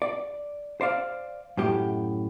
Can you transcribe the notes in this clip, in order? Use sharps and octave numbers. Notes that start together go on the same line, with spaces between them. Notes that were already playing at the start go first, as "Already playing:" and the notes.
D5
C5 D5 F5
F#2 A2 G4